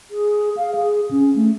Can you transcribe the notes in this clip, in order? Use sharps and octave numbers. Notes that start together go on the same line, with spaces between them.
G#4
F5
G#4
C#4
A3